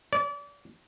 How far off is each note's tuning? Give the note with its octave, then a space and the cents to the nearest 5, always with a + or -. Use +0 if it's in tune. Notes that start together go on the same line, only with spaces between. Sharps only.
D5 -35